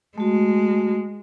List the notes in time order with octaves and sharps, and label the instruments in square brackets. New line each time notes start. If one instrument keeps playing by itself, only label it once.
[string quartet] G#3 [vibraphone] A3 F#4